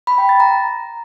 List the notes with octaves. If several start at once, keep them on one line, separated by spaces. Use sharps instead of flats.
B5
G5
A6
A#5